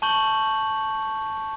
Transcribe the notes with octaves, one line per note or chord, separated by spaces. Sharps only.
A5 C#6 G6 F#7